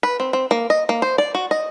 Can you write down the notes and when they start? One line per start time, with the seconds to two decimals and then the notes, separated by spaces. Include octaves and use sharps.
0.03 B4
0.20 C4
0.33 C4
0.51 A#3
0.70 D#5
0.89 A#3
1.02 C5
1.18 D5
1.35 F#4
1.51 D#5